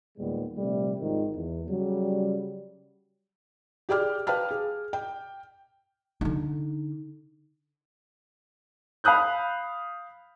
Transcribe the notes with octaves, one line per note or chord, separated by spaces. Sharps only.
D#2 A#2 G3 G#3 B3
A#1 C3 G3 A3
G#1 G#2 D#3 F3
E2
C#3 F#3 G3
G4 G#4 D5 G5 D6 F6
B4 F5 G5 A5 F6
G#4
G5
D3 D#4
F5 B5 D#6 F#6 G6